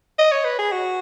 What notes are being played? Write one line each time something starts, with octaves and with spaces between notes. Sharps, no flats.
D#5
C#5
B4
G#4
F#4